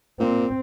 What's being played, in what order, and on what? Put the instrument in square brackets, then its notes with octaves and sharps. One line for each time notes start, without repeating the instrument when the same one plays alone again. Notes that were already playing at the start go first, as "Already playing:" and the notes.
[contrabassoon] A#2 [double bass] C4